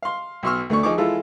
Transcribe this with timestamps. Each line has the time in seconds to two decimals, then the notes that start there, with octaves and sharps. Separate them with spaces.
0.03 F5 C6
0.43 B1 B2 C6 C#6 E6 F6
0.70 D2 A3 D4 C#6
0.83 F3 D#4 G#4 C#6 D6
0.98 E3 G#3 E4 F4 A4